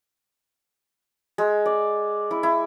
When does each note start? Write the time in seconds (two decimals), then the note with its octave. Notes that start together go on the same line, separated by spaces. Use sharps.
1.38 G#3
1.66 D5
2.31 E4
2.43 E4